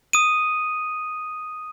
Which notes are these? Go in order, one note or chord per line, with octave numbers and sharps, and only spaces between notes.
D#6 D#7